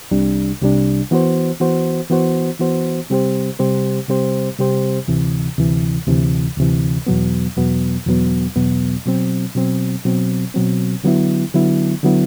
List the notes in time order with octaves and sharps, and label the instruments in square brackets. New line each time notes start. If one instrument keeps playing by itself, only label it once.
[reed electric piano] C2 C3 G3 D4
C2 C3 G3 D4
E3 B3 F#4 C5
E3 B3 F#4 C5
E3 B3 F#4 C5
E3 B3 F#4 C5
C3 G3 C4 G4 C5
C3 G3 C4 G4 C5
C3 G3 C4 G4 C5
C3 G3 C4 G4 C5
D2 C3 E3
D2 C3 E3
D2 C3 E3
D2 C3 E3
E2 B2 F#3 B3
E2 B2 F#3 B3
E2 B2 F#3 B3
E2 B2 F#3 B3
B2 F#3 C4
B2 F#3 C4
B2 F#3 C4
B2 F#3 C4
D3 F#3 B3 E4
D3 F#3 B3 E4
D3 F#3 B3 E4